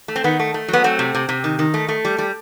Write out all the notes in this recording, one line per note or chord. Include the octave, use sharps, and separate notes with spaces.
A3
C4
D#3 B3
A3
A3
F#3 B3
A3 C4
C3
C3
C3
D#3
D#3
A3
A3
G3
G3